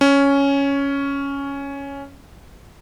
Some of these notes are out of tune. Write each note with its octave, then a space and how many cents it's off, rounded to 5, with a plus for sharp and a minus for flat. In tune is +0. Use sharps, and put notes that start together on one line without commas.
C#4 +5